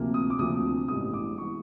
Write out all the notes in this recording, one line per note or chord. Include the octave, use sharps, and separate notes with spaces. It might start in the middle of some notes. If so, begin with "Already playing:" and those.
Already playing: D2 C3 F3 A#3
D#6
D6
D2 C3 F3 A#3 D#6
A1 G2 E3 G#3 B3 D#6
D6
E3 G#3 B3 C#6